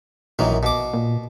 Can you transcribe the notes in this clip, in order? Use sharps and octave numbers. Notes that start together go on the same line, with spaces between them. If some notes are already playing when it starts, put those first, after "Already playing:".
A#1 F#2 D#3 E3
B2 D6
A#2